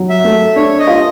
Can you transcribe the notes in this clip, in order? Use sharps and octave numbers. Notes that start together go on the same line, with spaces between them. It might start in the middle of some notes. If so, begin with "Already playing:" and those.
Already playing: F#3
E5
A3
D4 C#5
D#5
F4